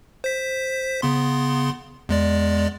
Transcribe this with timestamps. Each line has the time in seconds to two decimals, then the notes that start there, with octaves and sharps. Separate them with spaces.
0.24 C5 B6
1.02 C#3 B3 C6
2.09 E2 G#3 D5